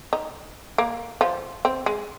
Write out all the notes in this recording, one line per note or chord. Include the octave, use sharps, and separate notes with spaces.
D#4
A#3
F3
C4
G#3